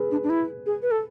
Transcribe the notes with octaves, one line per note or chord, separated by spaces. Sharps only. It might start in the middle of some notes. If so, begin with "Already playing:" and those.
Already playing: G#4 B4
D4
D4
E4
G#4
B4
A4